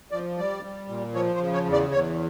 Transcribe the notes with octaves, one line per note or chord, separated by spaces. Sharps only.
F3 D5
G3 D5
G3
A#2
F3 C#5
C5
C#3
C#5
E2
D5
E2 C#5